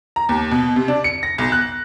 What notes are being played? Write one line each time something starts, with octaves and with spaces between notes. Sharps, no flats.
A#5
D#2
B2
C3
D4
C#7
A#6
B1
F#6